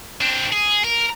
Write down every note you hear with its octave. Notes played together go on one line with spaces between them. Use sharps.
C4 D4
G#4
A#4